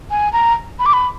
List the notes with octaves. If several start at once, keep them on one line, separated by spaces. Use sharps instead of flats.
G#5
A#5
B5
D6
B5